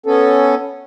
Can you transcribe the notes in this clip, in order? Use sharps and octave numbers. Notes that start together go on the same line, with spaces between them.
B3 C#4 A4